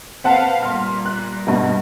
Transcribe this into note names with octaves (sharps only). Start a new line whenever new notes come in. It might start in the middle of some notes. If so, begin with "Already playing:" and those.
C4 B4 F5 F#5 A5
A#2 G3 C6 F6
F#6
G2 B2